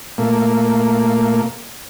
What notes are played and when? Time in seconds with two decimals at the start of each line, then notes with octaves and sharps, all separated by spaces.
0.18 A#2 A3 A#3